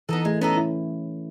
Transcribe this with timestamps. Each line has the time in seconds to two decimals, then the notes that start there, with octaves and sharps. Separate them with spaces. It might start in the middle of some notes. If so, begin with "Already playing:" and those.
0.09 E3 B3 D#4 A4
0.25 G#3 A3
0.41 B3 C#4 D#4 A4
0.57 E4